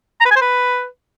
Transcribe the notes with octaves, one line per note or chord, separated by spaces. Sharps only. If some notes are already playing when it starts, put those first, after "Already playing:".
A#5
B4
G#5
C5
B4